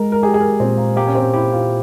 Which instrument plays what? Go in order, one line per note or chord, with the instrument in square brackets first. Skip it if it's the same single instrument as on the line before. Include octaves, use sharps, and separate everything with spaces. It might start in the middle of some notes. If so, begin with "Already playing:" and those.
Already playing: [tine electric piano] G#3 [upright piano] A#4
[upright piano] A#4
[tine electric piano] G4 [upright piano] G#4
[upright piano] G#4
A#4
[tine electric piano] A#2 [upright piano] C4
[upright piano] A#3
[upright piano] A#3 [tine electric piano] G4
[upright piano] C#4
C4
[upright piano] E4 [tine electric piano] G4
[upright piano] F4